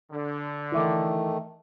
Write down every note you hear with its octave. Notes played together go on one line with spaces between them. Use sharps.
D3
D#3 E3 A3 E5 D6